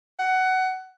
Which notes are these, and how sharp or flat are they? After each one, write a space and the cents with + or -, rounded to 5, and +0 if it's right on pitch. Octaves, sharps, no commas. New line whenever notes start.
F#5 +15